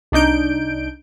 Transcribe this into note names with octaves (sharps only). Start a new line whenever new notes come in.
C2 D4 D#4 G6 D7